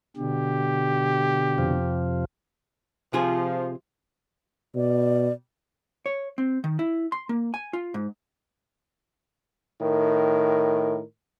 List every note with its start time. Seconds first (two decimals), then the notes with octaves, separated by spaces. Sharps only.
0.17 B2 D3 G4
1.58 F2 C3 F3
3.13 C3 F3 F4 G#4
4.76 B2 D5
6.06 C#5
6.38 C4
6.64 D#3
6.79 E4
7.12 C6
7.29 A#3
7.54 G#5
7.73 F4
7.94 G#2
9.82 A2 D#3 A#4